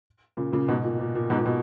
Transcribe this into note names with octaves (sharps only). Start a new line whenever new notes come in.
A#2 C#3
A#2 C#3
G#2 B2
A#2
A#2
A#2
G#2 B2
A#2
B2